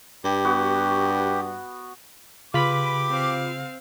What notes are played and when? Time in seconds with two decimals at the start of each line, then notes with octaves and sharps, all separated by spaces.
0.24 G2 G4
0.45 B3 F#4
2.54 C#3 F4 G4 B4 B5 D6
3.09 C4 F5